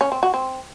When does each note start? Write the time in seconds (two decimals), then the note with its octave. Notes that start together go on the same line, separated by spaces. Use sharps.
0.01 C#4
0.12 C4
0.23 F#4
0.34 C4